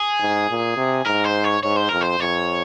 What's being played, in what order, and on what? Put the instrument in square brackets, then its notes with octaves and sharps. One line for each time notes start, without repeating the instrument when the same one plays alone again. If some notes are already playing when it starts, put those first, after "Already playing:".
Already playing: [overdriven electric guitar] G#4
[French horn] G#2
A#2
C3
[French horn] G#2 [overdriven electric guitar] A#4
[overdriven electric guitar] C5
C#5
[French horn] G#2 [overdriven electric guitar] C#5
[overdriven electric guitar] C5
[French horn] F2 [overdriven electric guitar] A#4
[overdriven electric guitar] C5
[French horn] F2 [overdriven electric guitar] C#5